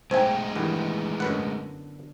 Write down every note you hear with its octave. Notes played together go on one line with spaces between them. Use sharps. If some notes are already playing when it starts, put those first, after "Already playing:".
B1 G#3 A3 D#4 C5 E5 G5 G#5
G2 D#3 E3 B3
F#2 D3 B4 D#5 F#5